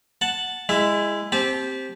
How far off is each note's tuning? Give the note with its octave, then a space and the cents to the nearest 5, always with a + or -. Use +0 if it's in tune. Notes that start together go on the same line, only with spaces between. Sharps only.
F#5 +0 A5 +0
G#3 -15 E4 +0 E5 +20
C4 +0 G4 +0 A5 -30